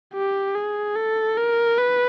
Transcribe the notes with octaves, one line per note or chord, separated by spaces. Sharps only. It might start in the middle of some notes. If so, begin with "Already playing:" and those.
G4
G#4
A4
A#4
B4